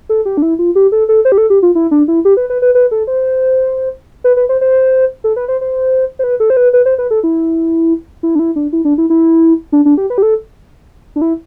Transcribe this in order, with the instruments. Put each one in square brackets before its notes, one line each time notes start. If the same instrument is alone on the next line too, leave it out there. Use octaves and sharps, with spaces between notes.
[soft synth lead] A4
G4
D4
E4
F4
G4
A4
A4
C5
G4
A4
G4
F4
E4
D4
E4
G4
B4
B4
B4
B4
A4
C5
B4
B4
C5
C5
A4
B4
C5
C5
C5
B4
A4
C5
B4
B4
C5
B4
A4
E4
E4
D4
E4
D4
E4
D4
E4
E4
D4
D4
G4
B4
G4
A4
D4
E4